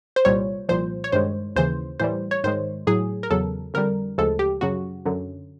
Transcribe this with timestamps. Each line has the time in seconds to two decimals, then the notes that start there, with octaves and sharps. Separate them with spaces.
0.16 C5
0.25 C2 A#2 G3 C#5
0.69 C2 A#2 F3 C5
1.04 C#5
1.12 G2 D#3 G#3 C5
1.56 D#2 C#3 E3 C5
2.00 A2 E3 G3 C5
2.31 C#5
2.44 G#2 D#3 G#3 C5
2.87 A2 F#3 G#4
3.23 A#4
3.31 E2 C#3 F#3 A4
3.74 F2 D3 G3 A#4
4.18 D2 C#3 F3 G#3 A4
4.39 G4
4.61 F#2 C#3 F#3 F#4
5.06 F#2 D3 F#3